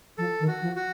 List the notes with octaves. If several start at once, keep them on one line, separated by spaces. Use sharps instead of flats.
F3 A4
D#3
F#4
F3
F#4